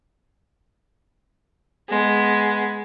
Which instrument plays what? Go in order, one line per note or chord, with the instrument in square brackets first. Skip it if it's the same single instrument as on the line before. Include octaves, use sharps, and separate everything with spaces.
[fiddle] G#3 B3